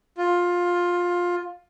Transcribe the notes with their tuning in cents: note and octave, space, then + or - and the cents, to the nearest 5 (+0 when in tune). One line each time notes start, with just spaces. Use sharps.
F4 +15